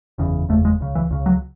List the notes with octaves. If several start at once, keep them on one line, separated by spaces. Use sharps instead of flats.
F#1 E2 C#3
F#1 E2 C#3 A3
G#3
C#2 C#3
E3
C#2 C#3
F#3